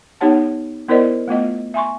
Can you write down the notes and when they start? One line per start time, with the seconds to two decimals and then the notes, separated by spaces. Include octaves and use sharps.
0.21 B3 D#4 G4 C#5 F#5 A5
0.88 B3 E4 A#4 C5 D5 D#5
1.28 A3 B3 F4 D#5
1.74 E5 G#5 C6 C#6